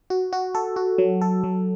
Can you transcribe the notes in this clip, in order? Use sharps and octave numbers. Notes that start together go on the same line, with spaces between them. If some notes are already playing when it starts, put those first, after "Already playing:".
F#4
F#4
A4
F#4
F#3
A4
F#3